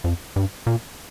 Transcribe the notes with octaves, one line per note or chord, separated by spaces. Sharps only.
F2
G2
A#2